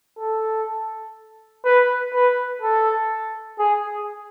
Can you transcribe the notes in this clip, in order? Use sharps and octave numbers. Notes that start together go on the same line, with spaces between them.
A4
B4
B4
A4
G#4